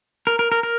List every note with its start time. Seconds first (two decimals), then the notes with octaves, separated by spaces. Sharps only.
0.27 A#4
0.39 A#4
0.52 A#4
0.63 A#4